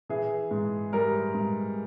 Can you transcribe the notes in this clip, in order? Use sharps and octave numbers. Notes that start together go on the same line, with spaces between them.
E3 G#4
G#2
G3 A#4
G#2